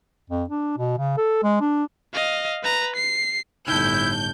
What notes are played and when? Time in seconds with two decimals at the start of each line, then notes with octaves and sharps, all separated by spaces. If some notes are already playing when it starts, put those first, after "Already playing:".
0.30 F2
0.50 D4
0.78 B2
0.98 C#3
1.18 A4
1.44 G#3
1.61 D4
2.14 D#5 F5
2.63 B4 A#5
2.96 C7
3.68 G1 A2 D#4 E4 A5 G6